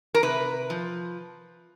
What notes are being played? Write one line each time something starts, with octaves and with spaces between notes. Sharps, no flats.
A#4
C3 B4
F3